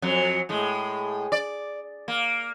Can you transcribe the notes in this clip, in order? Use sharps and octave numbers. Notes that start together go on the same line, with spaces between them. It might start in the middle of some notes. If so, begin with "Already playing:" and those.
F2 F#3
A2 G#3
D5
A#3